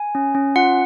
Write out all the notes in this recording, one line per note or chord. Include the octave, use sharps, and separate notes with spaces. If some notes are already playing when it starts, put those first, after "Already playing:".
Already playing: G#5
C#4
C#4
F4 F#5